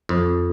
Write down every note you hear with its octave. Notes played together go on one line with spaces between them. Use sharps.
F2